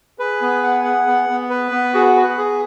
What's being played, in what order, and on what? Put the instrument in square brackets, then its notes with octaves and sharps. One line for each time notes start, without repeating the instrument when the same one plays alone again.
[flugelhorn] G#4 [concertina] B4
[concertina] B3
F#5
F#5
B3
B3
B4
B3
[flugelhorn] F#4 [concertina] G#4
[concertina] B4
G#4